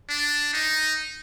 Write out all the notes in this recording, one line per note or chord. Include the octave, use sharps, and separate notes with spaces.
D4
D#4